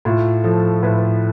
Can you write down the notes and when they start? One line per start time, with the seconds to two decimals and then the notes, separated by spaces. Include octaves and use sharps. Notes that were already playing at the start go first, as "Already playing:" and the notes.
0.05 A2 F4
0.44 F3 A4
0.83 A2 B4